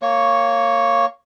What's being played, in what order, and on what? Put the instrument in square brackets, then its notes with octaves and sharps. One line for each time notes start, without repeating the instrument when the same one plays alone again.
[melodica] A#3 C#5 C#6